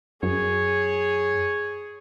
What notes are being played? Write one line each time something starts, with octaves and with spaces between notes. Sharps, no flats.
F#2 G#4 C#5